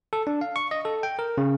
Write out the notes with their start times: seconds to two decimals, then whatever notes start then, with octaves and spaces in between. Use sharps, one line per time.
0.13 A4
0.27 D4
0.41 F5
0.56 C#6
0.71 D#5
0.85 A4
1.03 G5
1.19 A#4
1.38 C#3